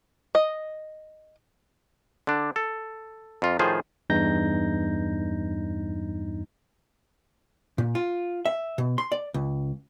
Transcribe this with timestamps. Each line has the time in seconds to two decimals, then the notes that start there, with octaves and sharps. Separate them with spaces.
0.35 D#5
2.27 D3 D4
2.56 A4
3.42 F2 F4
3.59 A2 D#3 F3 F4 G#4 C5
4.10 E2 G2 D#4 G6 A#6
7.78 A#2
7.95 F4
8.46 E5
8.78 B2
8.98 C6
9.12 D5
9.34 C#2